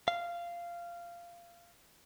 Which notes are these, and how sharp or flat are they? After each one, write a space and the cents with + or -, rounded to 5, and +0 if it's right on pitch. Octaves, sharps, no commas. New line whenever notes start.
F5 -15